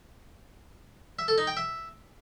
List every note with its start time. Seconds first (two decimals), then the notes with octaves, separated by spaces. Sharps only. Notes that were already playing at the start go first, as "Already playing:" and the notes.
1.19 E5
1.28 A4
1.38 D#4
1.47 G5
1.57 E5